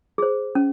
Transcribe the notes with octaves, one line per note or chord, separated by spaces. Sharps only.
G#4 C5
C#4